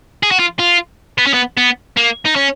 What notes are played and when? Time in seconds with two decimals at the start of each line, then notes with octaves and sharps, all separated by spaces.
0.23 G#4
0.31 F#4
0.39 F4
0.59 F4
1.18 B3
1.26 C#4
1.33 B3
1.57 B3
1.97 A#3
2.26 D#4
2.36 C#4